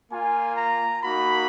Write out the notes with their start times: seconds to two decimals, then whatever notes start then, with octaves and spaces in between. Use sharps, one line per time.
0.11 A#3 F4 G#5
0.57 A#5
1.03 A#3 D#4 F#4 B5